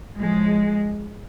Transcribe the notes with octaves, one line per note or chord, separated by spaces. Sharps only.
A2 F3 G#3